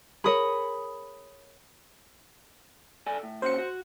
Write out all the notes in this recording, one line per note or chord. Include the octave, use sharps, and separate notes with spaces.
G#4 A#4 C#5 B5 D#6 C#7
A4 D5 G#5
A2
A#2 C#4 F#4 C5 C#7
F#4